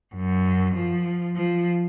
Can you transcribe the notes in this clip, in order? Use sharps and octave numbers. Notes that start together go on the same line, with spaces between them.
F#2
F3
F3